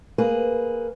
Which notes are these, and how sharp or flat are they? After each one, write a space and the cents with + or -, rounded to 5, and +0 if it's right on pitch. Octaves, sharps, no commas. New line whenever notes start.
A#3 +0 G#4 +5 B4 +0